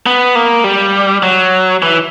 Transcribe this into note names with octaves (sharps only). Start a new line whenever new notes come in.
B3
A#3
G3
F#3
E3